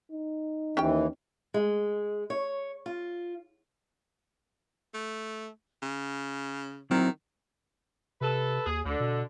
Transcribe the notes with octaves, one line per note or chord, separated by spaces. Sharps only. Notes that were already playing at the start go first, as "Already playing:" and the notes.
D#4
D#2 E3 C#4 G4 G5
G#3
C#5
F4
A3
C#3
D#3 F#3 C4 E4
C3 A4 B4
D#2 G#4
D2 D3
B2